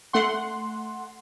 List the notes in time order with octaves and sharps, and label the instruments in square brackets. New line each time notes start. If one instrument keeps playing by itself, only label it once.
[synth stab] A3 F#5 C6